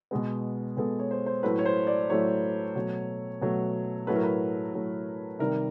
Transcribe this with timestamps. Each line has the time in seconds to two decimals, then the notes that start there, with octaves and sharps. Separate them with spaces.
0.11 B2 G#3 B3
0.77 B2 G#3 B3 A4
0.99 C#5
1.11 C5
1.26 C5
1.43 A2 F#3 A3 B4
1.59 C#5
1.65 C5
1.87 D5
2.10 A2 F#3 A3 C#5
2.76 B2 F#3 A3
3.41 B2 F#3 A3
4.07 A2 F#3 A3 B4
4.16 A#4
4.23 B4
4.74 A2 F#3 A3
5.39 C3 D#3 G3 A#4